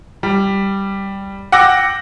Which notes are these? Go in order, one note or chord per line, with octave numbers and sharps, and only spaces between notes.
G3
F#5 G5 D6 E6 A#6